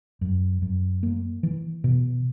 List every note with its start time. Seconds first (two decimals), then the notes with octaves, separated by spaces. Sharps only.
0.21 F#2
0.62 F#2
1.03 A#3
1.43 E3
1.84 B2